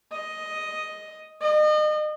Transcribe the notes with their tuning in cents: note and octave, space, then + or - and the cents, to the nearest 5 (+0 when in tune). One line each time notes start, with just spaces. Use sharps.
D#5 +5
D#5 -35